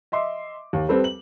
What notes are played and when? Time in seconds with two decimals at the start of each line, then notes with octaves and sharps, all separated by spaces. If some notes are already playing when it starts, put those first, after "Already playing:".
0.12 D#5 E5 C6 D6
0.73 D#2
0.89 G3 C4 A4 B4
1.04 F#7